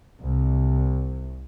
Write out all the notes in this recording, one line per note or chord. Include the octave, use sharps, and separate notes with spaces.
C2